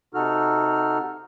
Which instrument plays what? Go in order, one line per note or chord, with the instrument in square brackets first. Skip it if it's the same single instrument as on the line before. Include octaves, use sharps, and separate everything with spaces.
[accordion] C3 D#4 F#4 A4 F6